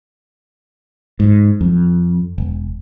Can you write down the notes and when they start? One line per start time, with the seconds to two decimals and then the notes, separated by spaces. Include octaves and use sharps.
1.20 G#2
1.61 F2
2.38 E1